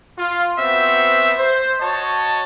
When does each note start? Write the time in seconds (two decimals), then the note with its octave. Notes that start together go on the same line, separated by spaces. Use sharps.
0.18 F4
0.58 B3 C4 F#4 C5 E5
1.37 C5
1.80 F#4 C#5 D#5 A5